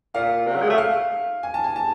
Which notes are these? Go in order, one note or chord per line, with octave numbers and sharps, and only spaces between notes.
A#2 F5
C3
F#3
G#3
A3
F5
G#5
A5
G#5
A5